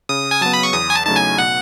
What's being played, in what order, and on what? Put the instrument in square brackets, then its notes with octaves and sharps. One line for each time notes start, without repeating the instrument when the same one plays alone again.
[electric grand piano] C#3 [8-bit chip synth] D#6
[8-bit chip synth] G#5
[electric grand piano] F#3 B3 [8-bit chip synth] A5
[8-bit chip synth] B5
C#6
[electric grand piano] E2 [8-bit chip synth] D#6
[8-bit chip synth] G#5
A5
[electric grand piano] C#3 F#3 A3 D#4 [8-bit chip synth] A5
[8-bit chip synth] G#5
[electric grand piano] B2 [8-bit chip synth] F#5